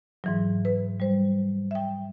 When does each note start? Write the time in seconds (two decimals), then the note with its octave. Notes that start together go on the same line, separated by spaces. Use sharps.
0.24 G#2 E3 F#3
0.65 B4
1.00 G3 C5
1.71 E5 G5